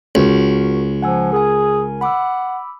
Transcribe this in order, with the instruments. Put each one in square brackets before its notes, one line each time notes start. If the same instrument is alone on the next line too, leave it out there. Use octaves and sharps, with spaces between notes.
[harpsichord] C#2 [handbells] F#4 A#4
[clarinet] F3 [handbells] F#5 G#5 E6
[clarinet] G#4 [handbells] A#4 G#5
[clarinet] F#5 [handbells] B5 D6 E6